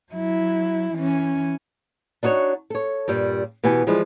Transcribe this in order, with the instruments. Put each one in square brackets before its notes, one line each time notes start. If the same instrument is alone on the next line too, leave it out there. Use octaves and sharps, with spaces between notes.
[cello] F#3 E4
E3 C#4
[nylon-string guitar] D4 D#4 F#4 B4 C#5
A4 C#5
G2 A#2 G3
B2 E3 B3 G4 G#5
E3 F3 G3 G#3 E4